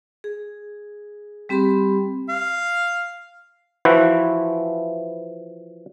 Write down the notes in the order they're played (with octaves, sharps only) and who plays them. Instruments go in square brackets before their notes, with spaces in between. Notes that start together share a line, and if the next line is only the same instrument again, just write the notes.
[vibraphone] G#4
G3 C4 G4 B5 C6
[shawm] F5
[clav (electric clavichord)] E3 F3 E4 F#4 B4 C5